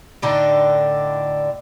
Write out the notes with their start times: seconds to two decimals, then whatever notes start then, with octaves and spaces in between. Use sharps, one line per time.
0.22 A2 D3 D4 D#4